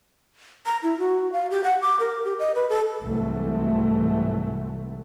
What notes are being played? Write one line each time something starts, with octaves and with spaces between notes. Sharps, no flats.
A#5
E4
F#4
F5
G4
F#5
D6
A#4
G4
D#5
B4
A4
C2 G#2 C3 E3 F#3 A3